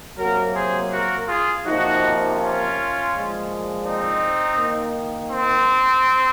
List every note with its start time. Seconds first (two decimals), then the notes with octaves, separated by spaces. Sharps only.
0.18 C3 F#3 A#3 F#4 A#4
0.55 G#4 C5
0.92 F#4 A#4
1.28 F4 G#4
1.65 C3 F3 A#3 D#4 F#4
2.38 C#4 F4
3.11 A#2 F3 G#3
3.84 C4 D#4
4.58 D#3 A#3
5.31 C4